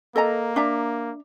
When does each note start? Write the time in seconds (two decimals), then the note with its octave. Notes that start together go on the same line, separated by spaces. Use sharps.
0.16 A#3 A4 D#5 A#5
0.56 D4 E5 A#5